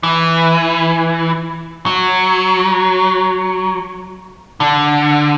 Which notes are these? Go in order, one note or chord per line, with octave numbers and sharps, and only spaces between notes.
E3
F#3
D3